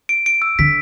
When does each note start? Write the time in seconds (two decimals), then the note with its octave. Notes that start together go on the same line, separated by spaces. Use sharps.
0.09 D7
0.26 D7
0.42 E6
0.59 D3 B6